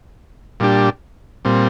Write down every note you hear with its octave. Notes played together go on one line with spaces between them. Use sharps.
A#2 G3 D4 G4
A#2 G3 C4